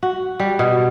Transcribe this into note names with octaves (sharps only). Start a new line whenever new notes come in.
F#4
G3
B2